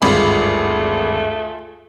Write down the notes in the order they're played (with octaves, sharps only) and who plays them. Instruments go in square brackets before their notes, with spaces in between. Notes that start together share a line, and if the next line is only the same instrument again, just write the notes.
[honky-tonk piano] G#1 B5 [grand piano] D2 G2 G#3 [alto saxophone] A3 [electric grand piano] F4 G#4